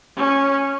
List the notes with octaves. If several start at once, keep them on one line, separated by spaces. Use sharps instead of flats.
C#4